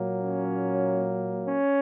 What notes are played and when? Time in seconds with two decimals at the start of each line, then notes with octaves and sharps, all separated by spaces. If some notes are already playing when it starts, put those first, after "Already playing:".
Already playing: A#2 F#3 A#3
0.21 C#4
1.49 C#4